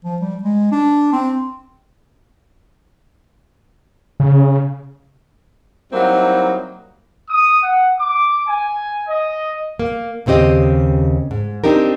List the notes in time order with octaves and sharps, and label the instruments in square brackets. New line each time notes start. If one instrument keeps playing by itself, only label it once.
[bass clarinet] F3
G3
G#3
D4
C4
[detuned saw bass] C#3
[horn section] F#3 G3 A#3 C4 D#4 E4
[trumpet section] D#6
F#5
D6
G#5
D#5
[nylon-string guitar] A#3
D#2 C#3 C4 G4 D#5
G#2
C4 D4 D#4 G4 A#4